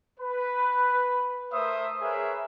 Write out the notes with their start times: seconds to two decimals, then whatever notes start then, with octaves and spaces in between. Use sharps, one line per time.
0.20 B4
1.52 A3 A#4 C5 E5 D#6
2.02 G#4 A#4 B4 C#5 E5